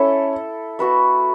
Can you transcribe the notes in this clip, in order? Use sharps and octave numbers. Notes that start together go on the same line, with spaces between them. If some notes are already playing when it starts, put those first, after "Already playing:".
Already playing: C#4 E4 A4 E5
B3 F#4 B4 E5